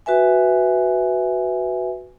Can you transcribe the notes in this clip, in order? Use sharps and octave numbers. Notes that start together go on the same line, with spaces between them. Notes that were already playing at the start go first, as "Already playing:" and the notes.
F#4 B4 E5 G#5